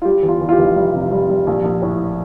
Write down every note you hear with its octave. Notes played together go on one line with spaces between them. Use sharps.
F4
G3 G4
E2
F4
E2
F4
G4
F1
G3
C3
G3
G3
A#1
A#1
A2